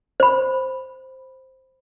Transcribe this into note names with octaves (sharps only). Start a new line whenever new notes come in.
C5 B5